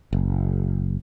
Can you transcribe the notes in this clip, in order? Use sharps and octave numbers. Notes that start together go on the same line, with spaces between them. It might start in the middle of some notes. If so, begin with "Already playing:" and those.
F#1